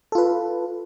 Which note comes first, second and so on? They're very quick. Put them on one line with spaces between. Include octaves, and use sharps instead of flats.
A4 F4 B4